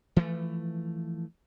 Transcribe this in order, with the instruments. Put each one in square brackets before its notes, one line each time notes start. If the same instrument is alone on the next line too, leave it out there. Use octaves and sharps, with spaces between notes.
[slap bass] E3 F3 A3